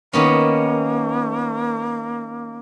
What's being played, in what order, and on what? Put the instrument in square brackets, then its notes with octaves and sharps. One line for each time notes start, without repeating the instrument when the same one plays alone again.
[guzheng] D#3 B3 C#4 [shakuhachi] A#3